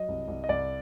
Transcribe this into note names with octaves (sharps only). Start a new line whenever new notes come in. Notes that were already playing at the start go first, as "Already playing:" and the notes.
Already playing: F#3 D#5
C2
C2
D#5
C2 D5